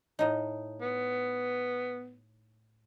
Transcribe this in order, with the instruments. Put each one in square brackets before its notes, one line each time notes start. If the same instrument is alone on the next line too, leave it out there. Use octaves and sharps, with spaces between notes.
[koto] A2 D#4
[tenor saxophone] B3